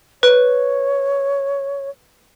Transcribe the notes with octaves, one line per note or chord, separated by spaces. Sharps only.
B4 C#5